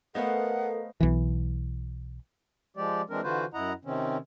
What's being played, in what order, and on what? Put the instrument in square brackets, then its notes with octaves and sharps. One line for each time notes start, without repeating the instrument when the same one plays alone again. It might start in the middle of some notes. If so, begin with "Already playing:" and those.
[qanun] A3 B3 C5 [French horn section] A4 A#4 [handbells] D#5 F5 [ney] F#5
[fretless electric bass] B1 E3
[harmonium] F3 G#3 G4 D5
E3 G#3 C4 D4 A#4
D3 E3 F4 F#4 B4 C5
F#2 E4 D#5 F#5 A#5
C3 D#3 C4 C#4